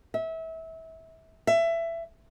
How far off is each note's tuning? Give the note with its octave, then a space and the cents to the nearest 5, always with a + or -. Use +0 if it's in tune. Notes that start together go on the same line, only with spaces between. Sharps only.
E5 -25
E5 +20